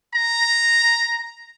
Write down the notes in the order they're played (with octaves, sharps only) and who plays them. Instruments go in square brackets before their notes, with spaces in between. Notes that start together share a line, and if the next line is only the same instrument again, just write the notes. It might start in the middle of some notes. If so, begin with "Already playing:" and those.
[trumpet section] A#5